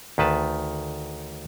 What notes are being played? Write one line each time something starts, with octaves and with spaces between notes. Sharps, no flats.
D2 D#3 B4 A5